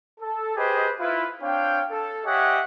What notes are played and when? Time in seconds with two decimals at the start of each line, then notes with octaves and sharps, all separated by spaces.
0.20 A4
0.56 G4 G#4 B4 C5 D#5
0.99 E4 F4 B4
1.41 C4 D4 C#5 F5 G5
1.90 A4
2.26 G4 C#5 D#5 E5 F#5 G#5